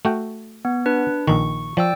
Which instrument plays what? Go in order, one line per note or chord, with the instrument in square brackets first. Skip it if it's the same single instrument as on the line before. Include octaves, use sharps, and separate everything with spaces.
[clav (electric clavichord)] A3 F#4 G5
[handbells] B3
D4 B4
[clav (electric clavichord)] A#1 D#3 [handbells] C#6
[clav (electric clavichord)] F3 [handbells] D5 G5 E6